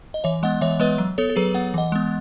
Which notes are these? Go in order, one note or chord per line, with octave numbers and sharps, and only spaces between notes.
D#5
E3 C#5 E5
G#3 B3 D#5 F#5
E3 C#5 E5
G#3 B3 B4 D#5
F#3
B3 A4 C#5
A4
F#3 G#4 B4
B3 F#5
E3 D#5 F#5
G#3 B3